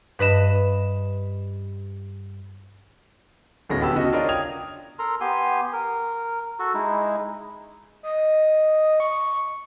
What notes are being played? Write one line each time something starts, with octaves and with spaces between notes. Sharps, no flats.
G2 B4 D#5 E7
D1 A2 G#3 B3 C#4 A#6
D2 B3 G4 A5 E6
C#3 F#4 D#5
D4 F4 A#4 C#5 D#5
G5 D#6 G#6 F7
A4 A#4 A#5 C6
B3 G4 G#5 C6
A#4
F#4 A4
G#3 D#4 E4
D#5
C#6